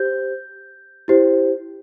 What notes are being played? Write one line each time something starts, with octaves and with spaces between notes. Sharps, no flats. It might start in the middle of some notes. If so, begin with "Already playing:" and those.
Already playing: G4 C5 G6
E4 G4 C5